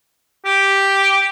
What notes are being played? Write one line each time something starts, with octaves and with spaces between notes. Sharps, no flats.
G4